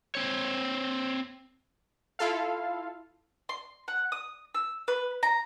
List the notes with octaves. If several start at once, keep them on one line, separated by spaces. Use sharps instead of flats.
C4 C#5
E4 F4 A4 F5
C6
F#5
D#6
E6
B4
A#5